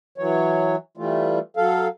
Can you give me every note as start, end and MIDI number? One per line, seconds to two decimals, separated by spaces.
0.18 0.76 52
0.18 0.76 54
0.18 0.76 73
0.97 1.39 52
0.97 1.39 55
0.97 1.39 57
0.97 1.39 65
1.57 1.88 54
1.57 1.88 69
1.57 1.88 77